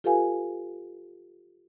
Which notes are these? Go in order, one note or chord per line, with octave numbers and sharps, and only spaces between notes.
F4 G4 A4 B4 F5 G#5